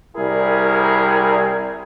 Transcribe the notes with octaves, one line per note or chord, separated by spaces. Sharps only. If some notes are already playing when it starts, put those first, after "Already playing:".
C2 G3 E4 G#4 A#4